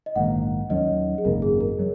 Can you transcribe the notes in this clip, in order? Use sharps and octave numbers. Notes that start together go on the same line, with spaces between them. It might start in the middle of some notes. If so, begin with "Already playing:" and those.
D#5
A#1 G#2 D#3 A#3 F#5
D#2 D#3 F#3 C#4 D#5
G#4
G#1 F#2 C#3 A#3 A#4
G#4
A#4
F#3